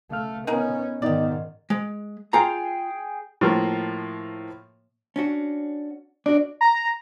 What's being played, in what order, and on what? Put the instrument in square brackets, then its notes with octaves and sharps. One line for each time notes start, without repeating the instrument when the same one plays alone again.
[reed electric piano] C#3 F5 F6 [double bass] A3
[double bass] B3 C#4 [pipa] D#4 G#4 A#4
[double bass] G#2 D#3 [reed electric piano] B3 D#4 D#5 [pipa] G4 D5
[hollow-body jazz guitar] G#3
[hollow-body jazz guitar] F4 A#5 [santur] G#4 G5 G#5
[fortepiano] A2 F3 A#3
[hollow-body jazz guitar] C#4 D4 F#4
[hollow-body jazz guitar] D4 F#4 [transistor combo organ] D5
[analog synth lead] A#5